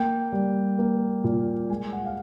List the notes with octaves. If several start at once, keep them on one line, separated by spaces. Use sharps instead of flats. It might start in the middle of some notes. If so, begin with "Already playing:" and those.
Already playing: A#3 G5
G3
A#3
A#2
G#3 G#5
F#5
F5